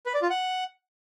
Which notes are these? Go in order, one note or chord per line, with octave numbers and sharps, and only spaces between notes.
B4
D5
F4
F#5